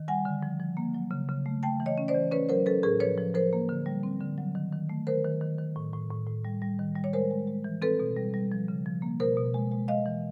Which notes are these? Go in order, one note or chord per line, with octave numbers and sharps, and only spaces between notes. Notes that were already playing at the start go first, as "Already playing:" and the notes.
Already playing: D#3
G3 F#5 G#5
D3
F3
F3
A#3
F#3
C#3
C#3
A3
A3 G5 A5
E3
C#5 D#5
C#4
C5 D5
E3
C#4 B4 C#5
F#3 A#4 C5
C#4 A4 B4
A2 G#4 A#4
F3 B4 C#5
F3
F3 A#4 C5
A#3
D3
G3
C4
D3
F#3
D#3
D#3
A3
D#3 A#4 C5
D#3
D#3
D#3
A2
A2
A2
A2
G3
G3
D#3
G3
C#5
G#3 A#4 C5
G#3
G#3
E3
C4 A4 B4
B2
G3
G3
F3
C#3
F3
A#3
B2 A#4 C5
B2
G#3
G#3
G#3 D#5 F5
E3